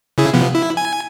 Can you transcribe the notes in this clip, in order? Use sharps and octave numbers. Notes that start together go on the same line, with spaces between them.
C#3 E4 G#4
C3 F3 B3
E4
G#5